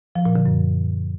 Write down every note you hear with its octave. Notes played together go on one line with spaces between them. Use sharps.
F3
A#2
D3
F#2